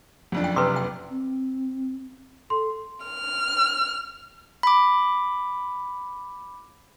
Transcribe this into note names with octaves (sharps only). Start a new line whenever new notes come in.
F#1 F2 D4
G5
C3 B4 C6
G5
C4
A4 C6
F6
B5 D6